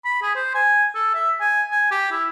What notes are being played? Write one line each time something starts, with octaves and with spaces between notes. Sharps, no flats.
B5
G#4
C5
G#5
A4
E5
G#5
G#5
G4
E4